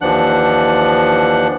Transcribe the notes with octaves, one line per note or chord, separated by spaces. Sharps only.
D#2 E3 F3 D4 F#5 F#6